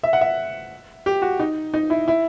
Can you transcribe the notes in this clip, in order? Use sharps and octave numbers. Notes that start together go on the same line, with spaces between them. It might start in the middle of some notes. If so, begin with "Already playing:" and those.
E5
F#5
E5
G4
F#4
D#4
D#4
E4
E4